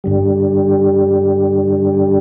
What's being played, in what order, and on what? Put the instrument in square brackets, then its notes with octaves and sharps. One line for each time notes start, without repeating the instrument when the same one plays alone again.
[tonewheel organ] G2 D3 G3